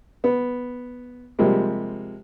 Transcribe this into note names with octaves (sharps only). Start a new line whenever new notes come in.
B3
C3 F3 G3 G#3 A#3